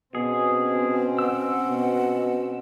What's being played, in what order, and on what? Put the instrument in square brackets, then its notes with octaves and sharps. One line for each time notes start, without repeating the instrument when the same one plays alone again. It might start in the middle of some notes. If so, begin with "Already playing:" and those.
[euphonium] B2 [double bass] C4 C#4 [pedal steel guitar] G#4
[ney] F#5 [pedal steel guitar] E6
[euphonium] B2